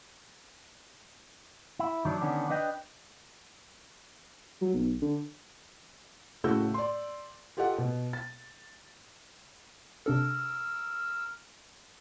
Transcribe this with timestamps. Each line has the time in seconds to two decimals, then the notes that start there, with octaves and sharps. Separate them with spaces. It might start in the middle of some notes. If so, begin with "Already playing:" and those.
1.79 E4
2.05 D#3 F#3 D4
2.21 D3 D#3 B3 C#4 D4
2.50 D4 B4 D#5 G5
4.61 F#3
4.74 B1
5.02 D3
6.44 A2 C#3 A3 F#4 E6 G6
6.74 D5 C6
7.57 F4 G4 A4 D#5 F#5
7.78 B2
8.13 A6
10.06 C3 D4 A4 A#4 E6